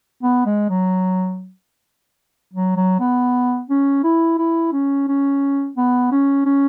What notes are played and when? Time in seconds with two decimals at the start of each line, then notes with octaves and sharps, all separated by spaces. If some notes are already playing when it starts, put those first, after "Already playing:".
0.23 B3
0.46 G#3
0.69 F#3
2.53 F#3
2.77 F#3
3.00 B3
3.69 C#4
4.04 E4
4.38 E4
4.72 C#4
5.08 C#4
5.77 B3
6.12 C#4
6.46 C#4